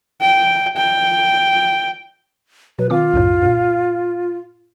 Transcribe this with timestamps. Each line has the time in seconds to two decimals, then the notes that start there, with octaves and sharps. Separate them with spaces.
0.21 G5
0.77 G5
2.79 B2 F#3 B4
2.90 D#3 C4 F4 D6
3.13 C2 F#2 A2
3.42 G2 A#2